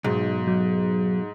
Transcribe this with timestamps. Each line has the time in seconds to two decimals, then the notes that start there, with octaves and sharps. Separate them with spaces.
0.04 B1 G#2
0.47 F#3